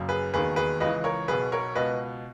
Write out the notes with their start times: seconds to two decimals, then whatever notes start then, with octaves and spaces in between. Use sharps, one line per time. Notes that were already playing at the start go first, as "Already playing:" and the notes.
Already playing: F#1 F#2 C#3
0.09 G#4 B4
0.32 E1 D#2 D#3 G#4 B4
0.56 G#4 B4
0.80 C#2 C#3 E3 B4 D#5
1.04 A#4 C#5
1.28 B1 B2 G#4 B4
1.52 A#4 C#5
1.75 C#2 B2 B4 D#5